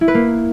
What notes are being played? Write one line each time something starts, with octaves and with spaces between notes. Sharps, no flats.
E4
B4
A#3